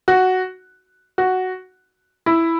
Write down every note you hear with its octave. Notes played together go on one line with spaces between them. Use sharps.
F#4
F#4
E4